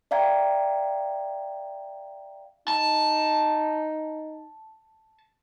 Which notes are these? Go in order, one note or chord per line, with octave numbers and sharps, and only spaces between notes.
D5 E5 F5 G5 A#5 G#6
D#4 A5